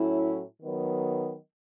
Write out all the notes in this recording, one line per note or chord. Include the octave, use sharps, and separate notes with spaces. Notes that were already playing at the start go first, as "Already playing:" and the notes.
Already playing: A2 F#3 C#4 E4
D#3 F#3 B3